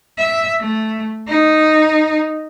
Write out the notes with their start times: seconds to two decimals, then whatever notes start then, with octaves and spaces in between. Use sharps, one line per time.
0.18 E5
0.60 A3
1.27 D#4